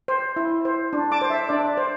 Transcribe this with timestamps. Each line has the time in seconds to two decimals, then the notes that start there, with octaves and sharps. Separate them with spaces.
0.08 C5
0.36 E4
0.65 C5
0.93 D4
1.12 A5 D6
1.22 C5
1.30 E5
1.49 D4 D5
1.77 C5